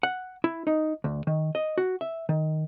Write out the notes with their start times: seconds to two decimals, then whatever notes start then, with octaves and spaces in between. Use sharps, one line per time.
0.03 F#5
0.44 E4
0.67 D#4
1.04 D2
1.27 D#3
1.55 D#5
1.78 F#4
2.01 E5
2.29 D#3